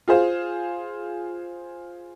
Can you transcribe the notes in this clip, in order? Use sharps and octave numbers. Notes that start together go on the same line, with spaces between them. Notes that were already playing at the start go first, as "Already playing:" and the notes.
F4 G#4 C5 F5